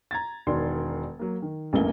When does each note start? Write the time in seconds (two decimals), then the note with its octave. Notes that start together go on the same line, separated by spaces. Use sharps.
0.11 A#5 G#6 A6
0.47 E1 D#3 D5 C6
1.19 F#3 A#3
1.42 D#3
1.73 A1 E2 G2 A3 A#3 G7